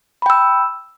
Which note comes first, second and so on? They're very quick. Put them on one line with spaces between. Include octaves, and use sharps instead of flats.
B5 G5 E6